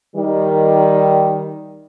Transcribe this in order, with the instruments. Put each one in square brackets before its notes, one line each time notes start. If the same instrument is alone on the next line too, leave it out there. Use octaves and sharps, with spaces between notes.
[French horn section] D#3 G3